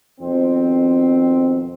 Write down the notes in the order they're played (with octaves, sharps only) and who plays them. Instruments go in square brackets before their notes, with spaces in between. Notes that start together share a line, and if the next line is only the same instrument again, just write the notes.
[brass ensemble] F2 B2 D#3 C4